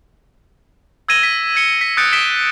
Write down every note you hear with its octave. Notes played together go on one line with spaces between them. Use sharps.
E6 G#6 A#6 D#7 E7 G7
B6
G#6 C#7 G7
B6
D#6 F#6 G6 A6 C#7 D7
D#6 B6 D7 E7 G7